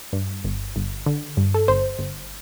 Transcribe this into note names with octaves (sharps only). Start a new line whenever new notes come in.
G2
G1
G1
D3
G2
A4
G1 C5
G1